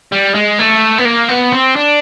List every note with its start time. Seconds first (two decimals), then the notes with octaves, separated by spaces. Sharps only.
0.12 G3
0.34 G#3
0.59 A3
0.98 B3
1.05 A#3
1.29 B3
1.53 C4
1.76 D4